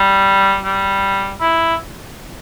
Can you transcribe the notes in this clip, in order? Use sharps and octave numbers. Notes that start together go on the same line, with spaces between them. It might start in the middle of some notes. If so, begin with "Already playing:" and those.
Already playing: G3
G3
E4